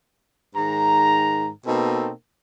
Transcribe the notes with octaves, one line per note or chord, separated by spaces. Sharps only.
G#2 D#3 A#5
B2 A#3 C4 D#4 A4